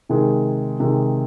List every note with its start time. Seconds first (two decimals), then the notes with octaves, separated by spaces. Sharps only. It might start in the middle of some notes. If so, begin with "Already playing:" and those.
0.09 C3 D#3 G#3
0.80 C3 D#3 G#3